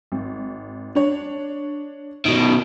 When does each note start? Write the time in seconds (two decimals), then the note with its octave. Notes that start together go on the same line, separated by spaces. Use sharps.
0.12 G#1
0.95 D4 C#5
2.25 B2 D#3